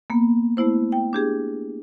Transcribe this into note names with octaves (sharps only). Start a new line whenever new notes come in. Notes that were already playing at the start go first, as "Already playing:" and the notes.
A#3 B3
A3 B3 E4 C5
G5
D4 G4 G#4